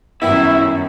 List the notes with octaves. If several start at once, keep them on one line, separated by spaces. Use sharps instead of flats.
F#2 D#3 G3 B3 E4 E5